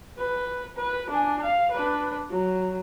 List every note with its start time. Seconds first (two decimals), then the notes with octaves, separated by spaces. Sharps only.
0.18 B4
0.76 B4
1.10 D4 G#5
1.43 F5
1.72 D4 B4
2.30 F#3